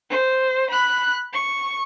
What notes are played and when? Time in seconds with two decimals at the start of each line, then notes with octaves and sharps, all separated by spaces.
0.10 C5
0.70 B5 F#6
1.33 C#6